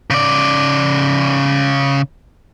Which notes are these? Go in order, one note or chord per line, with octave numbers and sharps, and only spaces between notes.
C#3 D5